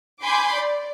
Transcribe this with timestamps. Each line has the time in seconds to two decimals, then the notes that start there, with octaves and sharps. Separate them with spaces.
0.22 G#5 B5 C6 D6 G6
0.55 D5